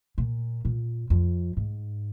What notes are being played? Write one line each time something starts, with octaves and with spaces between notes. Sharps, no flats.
A#2
A#2
F2
G#2